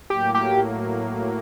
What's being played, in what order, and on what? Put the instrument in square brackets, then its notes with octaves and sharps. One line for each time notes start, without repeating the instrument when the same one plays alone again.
[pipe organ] A2 F#3 A#3 [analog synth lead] G4
[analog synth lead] G4